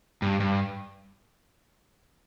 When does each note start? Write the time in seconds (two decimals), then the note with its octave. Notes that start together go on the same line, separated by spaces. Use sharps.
0.22 G2
0.40 G2